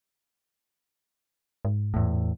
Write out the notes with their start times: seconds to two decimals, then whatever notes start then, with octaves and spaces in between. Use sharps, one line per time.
1.65 G#2
1.94 E2 A2